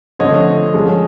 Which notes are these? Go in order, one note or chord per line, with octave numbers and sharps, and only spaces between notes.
D3 F3 A3 C4 C#5 D#5
F3 G#3 C#4